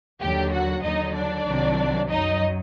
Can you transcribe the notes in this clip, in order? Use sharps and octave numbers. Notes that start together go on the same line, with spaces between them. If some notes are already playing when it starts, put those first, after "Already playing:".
D#2 D3 F#3 G4 G5
F#4 F#5
D#2 D3 F#3 D#4 D#5
D4 D5
C2 C3 D#3 F#3
F#2 F#3 D#4 D#5